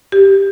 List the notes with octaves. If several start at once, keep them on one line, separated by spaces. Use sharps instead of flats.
G4